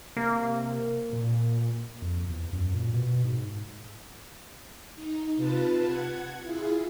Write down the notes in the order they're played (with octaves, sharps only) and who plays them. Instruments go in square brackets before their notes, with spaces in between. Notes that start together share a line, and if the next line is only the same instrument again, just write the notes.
[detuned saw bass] C3 [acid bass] A#3
[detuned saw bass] A#2
[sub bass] F2
E2
F#2
A#2
B2
G#2
[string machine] D#4
C3 F4 B4 A5
F#5 G#6
E4 F4 G#4